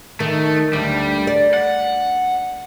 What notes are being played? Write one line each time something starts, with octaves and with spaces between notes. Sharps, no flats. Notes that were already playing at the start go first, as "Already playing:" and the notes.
D#3 A3
D2 G3
D5
F#5